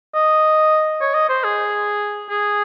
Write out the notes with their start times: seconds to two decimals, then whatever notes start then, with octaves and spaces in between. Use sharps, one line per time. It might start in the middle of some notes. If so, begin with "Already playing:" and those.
0.14 D#5
1.01 C#5
1.14 D#5
1.29 C5
1.44 G#4
2.30 G#4